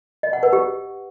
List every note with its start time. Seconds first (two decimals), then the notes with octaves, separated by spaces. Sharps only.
0.23 D#5
0.33 F#5
0.43 B4
0.53 G4